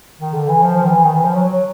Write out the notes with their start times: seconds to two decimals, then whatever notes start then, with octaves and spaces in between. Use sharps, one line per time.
0.20 D#3
0.34 D3
0.48 E3
0.62 F3
0.76 F3
0.84 D#3
0.89 E3
1.04 D#3
1.14 E3
1.24 F3
1.34 F#3
1.45 F#3